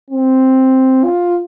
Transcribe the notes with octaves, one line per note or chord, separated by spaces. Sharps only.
C4
F4